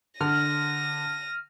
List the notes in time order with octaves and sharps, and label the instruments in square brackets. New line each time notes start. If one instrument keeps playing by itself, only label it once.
[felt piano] D3 [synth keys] F6 [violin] A#6 D#7